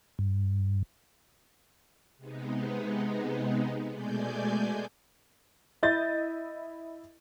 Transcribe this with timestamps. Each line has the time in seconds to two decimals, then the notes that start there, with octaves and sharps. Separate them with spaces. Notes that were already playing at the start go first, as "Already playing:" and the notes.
0.19 G2
2.17 C3 G#3 B3 D#4
3.90 B2 G#3 A3 D5 G#5 G6
5.83 E4 D#5 G6 A6